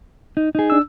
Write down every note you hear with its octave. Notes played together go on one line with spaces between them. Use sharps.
D#4
D#4 G#4
D4 E6